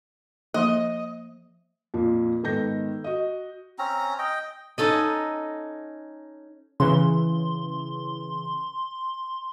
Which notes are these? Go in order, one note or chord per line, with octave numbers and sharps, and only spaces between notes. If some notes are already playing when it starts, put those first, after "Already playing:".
F3 A#3 D#5
F2 A#2 F4
G#2 D#3 B3 A4 G6 A#6
F#4 D#5
C4 C#4 A#5
D#5 G5
C#4 D#4 A4 D#5
C#3 E3 C6